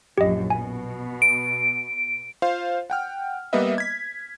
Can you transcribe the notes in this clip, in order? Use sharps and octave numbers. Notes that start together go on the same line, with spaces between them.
A#1 F#2 G4 D#5
B2 G#5
D7
F4 C5 F5
F#5 G5 F6
G3 A#3 B3 B4 D#5 E5
G#6 B6